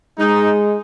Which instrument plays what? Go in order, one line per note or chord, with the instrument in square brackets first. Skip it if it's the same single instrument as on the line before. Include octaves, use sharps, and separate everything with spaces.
[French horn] G#3 [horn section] D#4